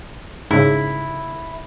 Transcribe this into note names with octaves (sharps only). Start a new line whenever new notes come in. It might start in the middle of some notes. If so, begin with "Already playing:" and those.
G#2 C#3 E4